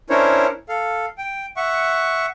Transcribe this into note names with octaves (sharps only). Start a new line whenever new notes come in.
C#4 D4 E4 A#4 C5 C#5
A4 F5
G5
E5 F#5 C#6